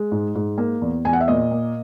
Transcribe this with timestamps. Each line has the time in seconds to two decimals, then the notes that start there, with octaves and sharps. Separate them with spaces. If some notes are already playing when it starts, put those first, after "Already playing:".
Already playing: G#3
0.11 G#2
0.35 G#2
0.58 A#3
0.82 E2
1.05 E2 G#5
1.13 F#5
1.21 E5
1.28 A#2 D#5
1.51 A#3